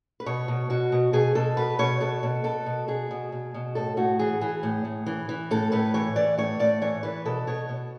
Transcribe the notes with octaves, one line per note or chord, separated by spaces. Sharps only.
B4
B2 C#5
B2
B2 F#4
B2
B2 G#4
B2 A4
B2 B4
B2 C#5
B2 A4
B2
B2 A4
B2
B2 G#4
B2
B2
B2
A2 A4
A2 F#4
E3 G#4
E3 G#4
A2
A2
E3
E3
A2 A4
A2 B4
E3 C#5
E3 D5
A2 C#5
A2 D5
E3 C#5
E3 B4
B2 A4
B2 C#5
B2